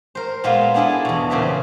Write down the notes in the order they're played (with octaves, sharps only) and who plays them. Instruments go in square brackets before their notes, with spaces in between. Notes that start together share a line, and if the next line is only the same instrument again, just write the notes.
[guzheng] A#4 C5
A#2 G#3 B3 F4 F5
B3 D4 E4 G#4 A4 G#5
E2 B2
A#2 C#3 C4 G4 G#4 E5